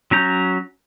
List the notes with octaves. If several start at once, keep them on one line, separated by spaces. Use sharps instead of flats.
F#3 C#4 A#5 G6